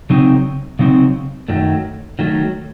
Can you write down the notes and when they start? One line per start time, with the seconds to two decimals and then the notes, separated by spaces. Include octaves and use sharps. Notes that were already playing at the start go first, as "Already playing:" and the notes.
0.10 C#3 F#3 C4 D#4
0.79 C#3 F#3 C4 D#4
1.48 F#2 D#3 F#3 A3
2.19 D#3 F#3 A3